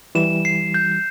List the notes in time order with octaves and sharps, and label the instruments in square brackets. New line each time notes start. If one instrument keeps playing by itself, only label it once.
[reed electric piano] E3 G3 [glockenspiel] E7
[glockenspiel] C7
G6